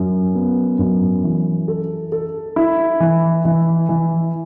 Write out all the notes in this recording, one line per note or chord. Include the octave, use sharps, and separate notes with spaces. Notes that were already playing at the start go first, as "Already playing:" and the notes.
Already playing: F#2
B3
F#2
E3
A4
A4
E4
E3
E3
E3